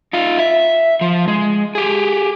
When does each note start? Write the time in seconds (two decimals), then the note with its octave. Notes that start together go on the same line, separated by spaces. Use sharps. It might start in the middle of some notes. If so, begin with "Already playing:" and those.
0.13 D#4 F4
0.39 E5
1.01 F3
1.28 G#3
1.75 G4 G#4